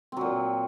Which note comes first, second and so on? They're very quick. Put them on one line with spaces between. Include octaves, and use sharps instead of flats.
C4 F#3 A#2